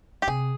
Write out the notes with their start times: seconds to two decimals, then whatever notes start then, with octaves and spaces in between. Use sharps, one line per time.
0.22 G4
0.27 C3 G#4